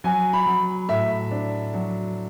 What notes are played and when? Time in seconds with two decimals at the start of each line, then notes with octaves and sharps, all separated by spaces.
0.04 F#3 G#5
0.33 B5
0.46 F#3
0.89 A2 E5
1.31 D4
1.74 F#3